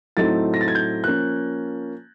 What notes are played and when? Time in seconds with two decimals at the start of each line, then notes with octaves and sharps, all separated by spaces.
0.17 A2 F#3 A3 C4 D#4 A6
0.54 A#6
0.61 A6
0.68 G#6
0.75 G6
1.04 F3 A#3 C#4 F#6